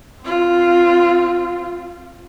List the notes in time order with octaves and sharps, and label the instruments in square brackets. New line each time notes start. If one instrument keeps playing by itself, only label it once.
[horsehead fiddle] C4 F4